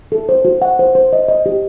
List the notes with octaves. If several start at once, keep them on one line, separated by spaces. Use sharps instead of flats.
A4
C5
F#4
F#5
C5
C5
D#5
D#5
G4